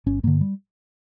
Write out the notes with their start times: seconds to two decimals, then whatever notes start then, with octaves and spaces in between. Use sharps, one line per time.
0.06 G1 C#4
0.23 G2 D3 A#3
0.41 G3